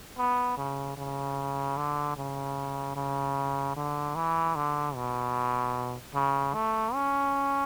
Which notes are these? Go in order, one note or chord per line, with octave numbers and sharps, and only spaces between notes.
B3
C#3
C#3
D3
C#3
C#3
D3
E3
D3
B2
C#3
A3
C#4